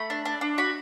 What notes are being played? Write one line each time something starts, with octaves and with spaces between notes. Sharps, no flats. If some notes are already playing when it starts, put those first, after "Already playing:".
Already playing: A3 B5
D4
D4
D4
F#4 B5